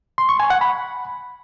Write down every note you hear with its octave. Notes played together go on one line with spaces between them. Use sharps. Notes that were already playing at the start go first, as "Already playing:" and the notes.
C6
C#6
G#5
F#5
B5